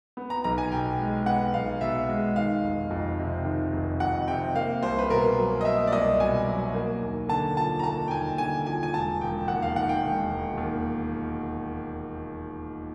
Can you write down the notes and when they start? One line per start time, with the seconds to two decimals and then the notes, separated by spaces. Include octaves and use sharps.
0.17 B3
0.30 A#5
0.44 B1 A#5
0.58 G#5
0.71 B2 G5
0.99 G#3
1.26 B3 F#5
1.54 B1 F5
1.81 B2 E5
2.09 G#3
2.36 D#3 F5
2.64 F1
2.91 F2
3.19 C3
3.45 D#3
3.72 F1
4.00 F2 F#5
4.27 C3 G5
4.55 A#3 F5
4.83 C2 C5
4.99 B4
5.10 B2 A#4
5.37 F#3
5.61 D#5
5.65 A#3 E5
5.87 D5
5.92 C2 D#5
6.20 B2 G#5
6.47 F#3
6.74 A#3
7.02 D#2
7.29 D3 A5
7.57 F3 A5
7.79 A#5
7.84 A#3 A5
8.08 G5
8.11 D#2 G#5
8.38 D3 G#5
8.66 F3 G#5
8.83 G#5
8.94 E1 A5
9.21 E1 G5
9.48 D#2 F#5
9.62 F5
9.76 D#3 F#5
9.89 G5
10.04 E1
10.31 E1
10.57 D#2